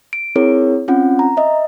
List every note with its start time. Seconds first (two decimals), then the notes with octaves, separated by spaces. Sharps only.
0.13 D7
0.36 C4 E4 G#4 A#4 C#5
0.88 C4 C#4 F4 F#5
1.19 A#5
1.37 D#5 E5